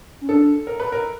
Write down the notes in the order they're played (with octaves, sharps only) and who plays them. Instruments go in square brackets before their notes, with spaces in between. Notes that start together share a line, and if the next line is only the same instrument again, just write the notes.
[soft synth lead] C#4
[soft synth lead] D4 [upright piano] A4
[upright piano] A#4
B4
A#4